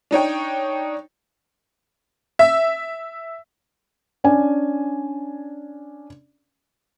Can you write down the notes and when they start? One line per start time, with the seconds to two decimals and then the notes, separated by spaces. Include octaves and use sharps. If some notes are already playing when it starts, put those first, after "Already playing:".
0.11 D4 D#4 C#5 G5
2.39 E5
4.24 C#4 D4 D5 G#5